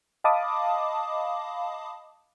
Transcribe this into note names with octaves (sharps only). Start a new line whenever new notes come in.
D#5 F5 A5 B5 D6 D#6